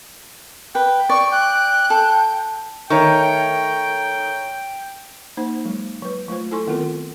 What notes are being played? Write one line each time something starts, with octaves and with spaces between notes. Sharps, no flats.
B4 G5
D5 C#6
G5 F#6
A4
D#3 A3 C#5 G5 A#5 C#6
A#3 D#4 C5
F#3 G#3
F#3 B4
F#3 A3 F4 C5
E4 A4 G#5 C6 C#6
D#3 B3 C4 F4 A#4